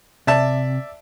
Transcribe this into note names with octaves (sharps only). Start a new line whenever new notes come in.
C3 D5 E5 A5